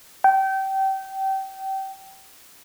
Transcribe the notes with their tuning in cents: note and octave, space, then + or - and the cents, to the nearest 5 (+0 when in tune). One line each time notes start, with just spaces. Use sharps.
G5 -25